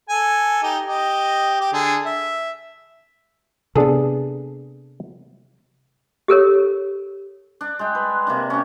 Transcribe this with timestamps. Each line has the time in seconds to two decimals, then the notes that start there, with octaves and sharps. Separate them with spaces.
0.09 A4 G#5
0.63 D#4 G4
0.86 G4 D#5
1.61 G4
1.73 D3 G#4
2.06 E5
3.75 C3 B3 D4 G#4 A4
6.28 G4 A4 A#4 C#5
7.61 D4
7.79 G#3 G5
7.95 B4
8.27 C3 A#3 D4
8.50 C#4 G4